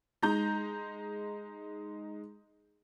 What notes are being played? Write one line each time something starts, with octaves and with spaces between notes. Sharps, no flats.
G#3 D#4 A#5 G6